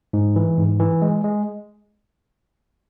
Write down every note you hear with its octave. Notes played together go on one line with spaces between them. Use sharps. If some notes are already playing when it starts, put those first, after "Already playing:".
G#2
E3
G#2
E3
G#3
G#3